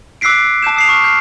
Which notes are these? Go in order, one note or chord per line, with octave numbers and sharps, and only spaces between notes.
D6 E6 F#6 B6 C7 D7
E6
A5 D6 G6 E7
D#6 C7 F7
C#6 F6
F6 G6 C7